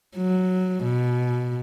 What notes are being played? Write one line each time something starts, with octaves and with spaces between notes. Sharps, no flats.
F#3
B2